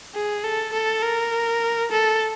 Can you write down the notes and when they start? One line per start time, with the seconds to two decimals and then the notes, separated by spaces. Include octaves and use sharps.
0.15 G#4
0.44 A4
0.73 A4
1.02 A#4
1.91 A4